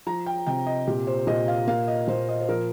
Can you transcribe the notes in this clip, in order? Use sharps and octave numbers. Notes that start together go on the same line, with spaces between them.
F3 A#5
G5
C3 G5
D#5
A#2 G4
C5
A#2 D#5
F5
A#3 F5
D#5
A#2 C5
D#5
C5
F3 A#4